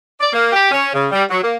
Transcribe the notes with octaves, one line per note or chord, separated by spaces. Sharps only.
D5
A#3
G4
C#4
C#3
G3
F#3
A#3